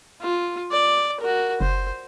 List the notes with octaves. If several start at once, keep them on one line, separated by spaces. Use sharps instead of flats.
F4
D5
F#4 A#4
F#1 C5